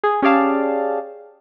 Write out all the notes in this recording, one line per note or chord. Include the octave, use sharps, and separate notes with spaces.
G#4
C#4 G4 G#4 D5 F5 A5